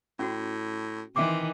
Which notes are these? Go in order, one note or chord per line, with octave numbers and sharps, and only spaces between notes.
A2 C#4 F#4
D#3 E3 C4 E5 D6